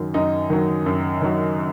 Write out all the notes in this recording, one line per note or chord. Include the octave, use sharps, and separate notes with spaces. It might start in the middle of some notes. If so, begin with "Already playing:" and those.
Already playing: F#2 D#3 F#3
F#2 D#4
D#3 F#3
F#2
D#3 F#3